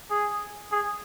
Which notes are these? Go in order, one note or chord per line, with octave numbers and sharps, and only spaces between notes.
G#4
G#4